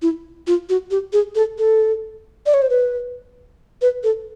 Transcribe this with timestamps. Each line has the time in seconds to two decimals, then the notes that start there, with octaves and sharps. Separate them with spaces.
0.02 E4
0.47 F4
0.69 F#4
0.91 G4
1.13 G#4
1.35 A4
1.58 A4
2.46 D5
2.54 C#5
2.62 C5
2.70 B4
3.82 B4
4.03 A4